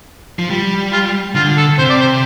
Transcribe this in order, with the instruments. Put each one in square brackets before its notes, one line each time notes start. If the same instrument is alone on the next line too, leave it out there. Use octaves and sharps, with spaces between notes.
[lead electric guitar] F3
G3
[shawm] F4
[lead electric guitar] D3 [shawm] F4
[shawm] A4
[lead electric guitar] C3 [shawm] C5
[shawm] D5
C5